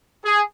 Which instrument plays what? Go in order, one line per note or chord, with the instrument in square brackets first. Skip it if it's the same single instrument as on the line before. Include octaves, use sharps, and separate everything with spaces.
[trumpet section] G#4